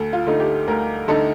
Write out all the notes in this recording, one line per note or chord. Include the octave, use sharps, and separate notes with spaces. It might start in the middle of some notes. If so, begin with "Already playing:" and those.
Already playing: D2 A4
F4
D3 A3 D#4
G4
D2 A#4
D3 A3 D#4 A4